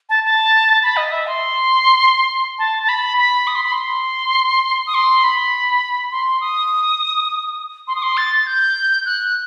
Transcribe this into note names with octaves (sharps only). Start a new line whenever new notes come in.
A5
A5
B5
D#5
E5
C6
A5
A5
B5
B5
D#6
C6
B5
C6
D#6
C6
B5
C6
D#6
C6
D#6
C6
A6
G6
F#6